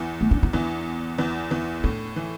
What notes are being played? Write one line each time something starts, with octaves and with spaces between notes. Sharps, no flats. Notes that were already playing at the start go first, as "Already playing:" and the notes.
Already playing: E2 E3
A3
D4
E4
E2 E3 D4
E2 E3
E2 E3
A2 D4
E3